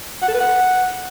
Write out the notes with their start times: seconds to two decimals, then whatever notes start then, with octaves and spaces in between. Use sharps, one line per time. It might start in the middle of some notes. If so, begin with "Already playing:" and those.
0.22 F#5
0.28 A4
0.34 B4
0.40 F#5